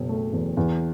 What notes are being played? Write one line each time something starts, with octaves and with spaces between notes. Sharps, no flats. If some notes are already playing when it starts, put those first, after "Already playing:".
Already playing: F#1 B2
A3
E2
E2